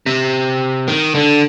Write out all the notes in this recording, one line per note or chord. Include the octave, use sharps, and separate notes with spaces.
C3
D#3
D3